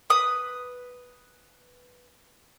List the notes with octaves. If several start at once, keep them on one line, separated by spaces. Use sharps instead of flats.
B4 D#6